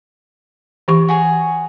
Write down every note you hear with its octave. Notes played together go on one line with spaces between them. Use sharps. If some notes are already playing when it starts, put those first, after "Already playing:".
E3 G4 C#6
F#4 G#4 C#5